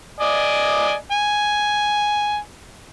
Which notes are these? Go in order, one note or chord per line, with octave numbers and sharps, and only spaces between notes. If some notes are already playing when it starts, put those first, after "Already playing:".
D5 D#5 G#5
G#5